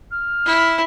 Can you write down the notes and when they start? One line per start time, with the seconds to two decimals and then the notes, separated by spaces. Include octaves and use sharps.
0.10 F6
0.45 E4